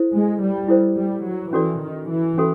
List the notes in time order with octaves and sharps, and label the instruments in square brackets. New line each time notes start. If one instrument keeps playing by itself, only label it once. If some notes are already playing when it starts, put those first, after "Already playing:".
Already playing: [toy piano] E4 A4 C5
[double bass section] G#3
G3
[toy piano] E4 A4 C5
[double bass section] G3
F#3
[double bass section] E3 [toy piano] C#4 F#4 A4 D5
[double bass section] D#3
E3
[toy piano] C#4 F#4 A4